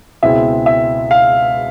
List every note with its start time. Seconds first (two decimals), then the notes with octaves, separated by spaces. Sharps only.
0.23 C#2 B2 G#3 C4 E4 E5
0.66 E5
1.11 F5